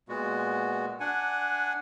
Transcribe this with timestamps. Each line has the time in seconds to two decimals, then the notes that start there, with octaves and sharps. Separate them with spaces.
0.09 A#2 G#3 B3 F#4
1.00 D4 F#5 G#5